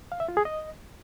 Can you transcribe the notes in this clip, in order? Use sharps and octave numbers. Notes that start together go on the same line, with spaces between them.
F5
E5
F4
G#4
D#5